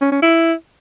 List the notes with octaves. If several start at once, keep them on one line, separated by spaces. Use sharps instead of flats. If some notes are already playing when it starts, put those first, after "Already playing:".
C#4
C#4
E4